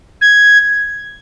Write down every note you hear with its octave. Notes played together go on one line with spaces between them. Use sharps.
G#6